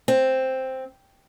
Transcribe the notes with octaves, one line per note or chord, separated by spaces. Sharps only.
C4